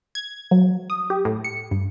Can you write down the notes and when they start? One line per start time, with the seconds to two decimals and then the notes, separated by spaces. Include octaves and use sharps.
0.15 G#6
0.51 F#3
0.90 D#6
1.10 G4
1.25 A2
1.44 C#7
1.71 G2